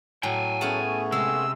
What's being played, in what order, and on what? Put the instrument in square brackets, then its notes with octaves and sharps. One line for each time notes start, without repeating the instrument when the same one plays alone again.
[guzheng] A2 [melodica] F#3 [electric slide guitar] G5 G#5
[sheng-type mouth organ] A3 B3 G#4 [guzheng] C#4 F#5 A5
[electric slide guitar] C3 [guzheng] G#3 [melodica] E6